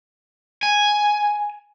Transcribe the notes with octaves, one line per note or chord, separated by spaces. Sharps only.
G#5